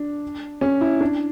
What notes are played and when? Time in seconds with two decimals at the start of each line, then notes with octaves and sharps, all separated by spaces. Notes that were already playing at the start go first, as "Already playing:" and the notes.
Already playing: D4
0.61 C#4
0.81 E4
1.01 D4